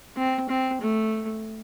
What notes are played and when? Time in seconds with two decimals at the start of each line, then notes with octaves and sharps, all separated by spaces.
0.16 C4
0.49 C4
0.81 A3